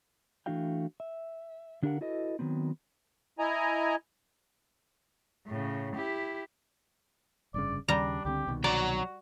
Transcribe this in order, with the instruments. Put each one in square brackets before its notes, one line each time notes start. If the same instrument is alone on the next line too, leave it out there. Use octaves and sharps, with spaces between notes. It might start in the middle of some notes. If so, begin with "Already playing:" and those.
[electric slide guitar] E3 A3 D4 F#4 F5 G5
E5
D3 D4 G4 A#4 F5 F#5
E4 F#4 A4 B4 D#5
D#3 F#3 B3 C4
[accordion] E4 D#5 G#5 A#5
[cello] A2 C#3
E4 G4
[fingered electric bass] F1 G2 C#3 [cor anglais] D5
[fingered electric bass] D#2 C#3 [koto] G3 A#5 [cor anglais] D4
[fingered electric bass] C#2 D3 C4 [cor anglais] G4
[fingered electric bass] C2 B2 D#3
[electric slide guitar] F#3 A#5 [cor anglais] F#4 [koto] D5